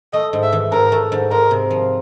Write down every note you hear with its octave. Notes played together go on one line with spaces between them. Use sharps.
A3 D#5
G#2
E5
E3
G#2 A#4
A3
G#2
G#3 A#4
C3
F3